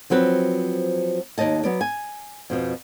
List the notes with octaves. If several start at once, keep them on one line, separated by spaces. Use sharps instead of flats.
F3 F#3 C4 B4
D#2 G#3 C#5 D#5 A5
F#3 B3 D5
G#5
F2 B2 F3